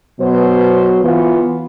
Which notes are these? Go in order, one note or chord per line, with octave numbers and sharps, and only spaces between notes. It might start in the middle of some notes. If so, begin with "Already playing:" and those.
B2 F#3 B3 C5
E3 B3 F4